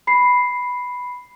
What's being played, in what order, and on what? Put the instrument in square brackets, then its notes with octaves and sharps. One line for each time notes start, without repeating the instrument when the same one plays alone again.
[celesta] B5 C7